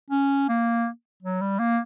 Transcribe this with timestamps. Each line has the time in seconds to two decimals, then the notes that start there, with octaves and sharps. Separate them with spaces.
0.10 C#4
0.49 A#3
1.23 F#3
1.41 G3
1.59 A#3